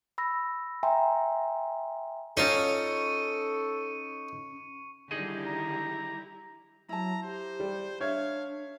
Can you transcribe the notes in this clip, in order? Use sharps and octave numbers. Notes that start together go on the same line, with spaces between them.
B5 E6 A#6
E5 G5 G#5 A#5 C6
C#4 D#4 F4 A4 C#5 C#6 C#7 D#7
D3 D#3 G3 D#4 E4 G4 G#4 D#5
A#5
F#3 E4 A5 A#5
G4 C5
G3
D4 C#5 E5 F5 G#6